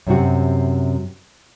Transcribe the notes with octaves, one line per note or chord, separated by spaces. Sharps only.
F#2 C3 F#4